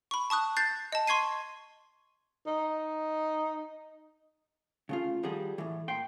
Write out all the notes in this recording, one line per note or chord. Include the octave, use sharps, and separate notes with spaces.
B5 C#6
A5 C#6 D#6 F#6
F#6 G6 A6 C7
D#5 A5
C6 C#6 G#6 C7 D#7
D#4
C#3 A3 F4
D#3 F3 G3 F#4 G#4 A4
A2 E3
A#2 G5 C6